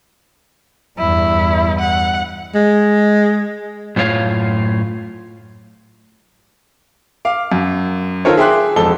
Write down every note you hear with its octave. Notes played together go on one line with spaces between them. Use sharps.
E2 G2 E4
F#5
G#3
F#2 A2 C#4 F4 C#5 F5
F5 D6
F#2
D#3 F4 A4 A#4 C5 C#5
G#4 E5 G5 C6 D6 F#6
E1 F2 A4 A5 G7